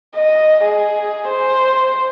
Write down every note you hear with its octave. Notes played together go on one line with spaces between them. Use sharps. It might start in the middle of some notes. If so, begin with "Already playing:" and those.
D#5
G#4
C5